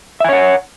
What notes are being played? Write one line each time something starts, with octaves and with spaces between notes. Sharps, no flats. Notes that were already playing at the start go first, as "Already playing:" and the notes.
C#5 E5 F#5 G#5